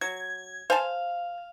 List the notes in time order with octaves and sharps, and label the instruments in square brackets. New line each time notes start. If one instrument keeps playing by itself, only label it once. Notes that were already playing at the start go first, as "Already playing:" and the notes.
[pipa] F#3 [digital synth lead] G#6
[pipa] C5 G#5 A5 [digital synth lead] F5